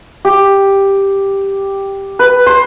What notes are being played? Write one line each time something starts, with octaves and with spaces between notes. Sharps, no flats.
G4
B4
C5